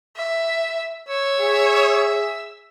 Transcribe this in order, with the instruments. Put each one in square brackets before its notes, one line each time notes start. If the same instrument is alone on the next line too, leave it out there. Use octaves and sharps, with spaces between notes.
[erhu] E5
[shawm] C#5 [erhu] E6
[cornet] G#4 [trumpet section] E5